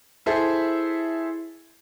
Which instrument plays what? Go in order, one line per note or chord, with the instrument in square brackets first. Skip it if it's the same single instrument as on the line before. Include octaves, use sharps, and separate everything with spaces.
[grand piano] E4 G#4 A4 C5 E5